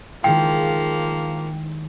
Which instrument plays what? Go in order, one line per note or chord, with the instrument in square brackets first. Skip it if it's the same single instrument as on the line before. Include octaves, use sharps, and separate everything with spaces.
[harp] D#3 G#3 E4 [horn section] F3 A#3 [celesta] G5